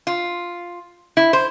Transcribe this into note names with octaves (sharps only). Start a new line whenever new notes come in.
F4
E4
C5